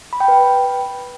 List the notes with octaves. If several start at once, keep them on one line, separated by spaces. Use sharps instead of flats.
B5
G5
B4